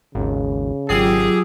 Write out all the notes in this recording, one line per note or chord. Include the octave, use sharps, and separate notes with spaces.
G#1 D#2 C#3
G#1 F#3 F4 G4 G#4 E6 C7